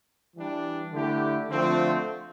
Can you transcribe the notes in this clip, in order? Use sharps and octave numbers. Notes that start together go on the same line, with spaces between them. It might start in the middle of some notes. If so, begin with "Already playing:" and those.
E3 G3 D4
D3 A3 E4 G4
D3 F3 A3 C4 F4